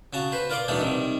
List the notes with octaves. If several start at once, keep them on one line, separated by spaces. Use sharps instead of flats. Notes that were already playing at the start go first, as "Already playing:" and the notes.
C#3 F#4 A5 A#5
B4 C5
F4 A#4 D5 C6 D6
E3 F#3 G#3 D4 D#4 A4
C3 D#3 G3